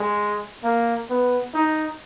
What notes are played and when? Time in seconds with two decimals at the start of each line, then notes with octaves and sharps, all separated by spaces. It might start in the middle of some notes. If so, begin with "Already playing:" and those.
Already playing: G#3
0.64 A#3
1.09 B3
1.54 D#4